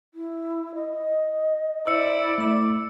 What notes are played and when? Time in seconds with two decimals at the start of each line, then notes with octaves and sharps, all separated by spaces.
0.14 E4
0.75 D#5
1.87 E4 C5 D5 E6 C#7
2.38 A3 D6